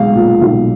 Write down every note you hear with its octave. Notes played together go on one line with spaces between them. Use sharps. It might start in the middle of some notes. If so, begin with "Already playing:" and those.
Already playing: B1 G#3 F5
A#2
B1